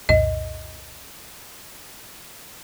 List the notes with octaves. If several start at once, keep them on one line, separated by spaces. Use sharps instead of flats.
C2 F2 A#2 D#5